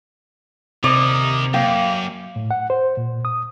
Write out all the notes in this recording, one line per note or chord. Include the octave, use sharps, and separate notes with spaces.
C3 A#3 D#4 D5 D#6
F#2 A#3 G5
A2
F#5
C5
A#2
D#6